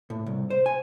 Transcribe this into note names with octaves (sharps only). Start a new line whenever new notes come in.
A2
C2
C5
G#5